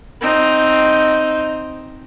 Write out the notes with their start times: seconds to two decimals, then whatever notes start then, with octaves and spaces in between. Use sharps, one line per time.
0.21 C4 D#4